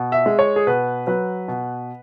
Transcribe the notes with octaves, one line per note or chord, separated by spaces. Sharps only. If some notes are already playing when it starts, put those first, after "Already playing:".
Already playing: B2
E5
G#3
C#5
G#4
B2 B4
F#3 B4
B2